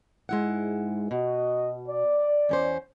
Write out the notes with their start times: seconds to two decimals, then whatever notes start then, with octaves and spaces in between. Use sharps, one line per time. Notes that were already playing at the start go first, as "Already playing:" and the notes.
0.29 G#2 G#3 E4 F#5
1.11 B2 F#4 D#5
1.88 D5
2.49 E2 C#4 C5